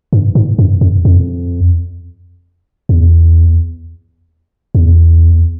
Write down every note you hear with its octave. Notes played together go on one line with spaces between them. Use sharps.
G2
G#2
F#2
F2
F2
E2
E2